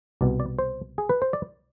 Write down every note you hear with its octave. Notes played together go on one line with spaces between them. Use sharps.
C2 B2 D5
D5
C5
G#4
B4
C5
D5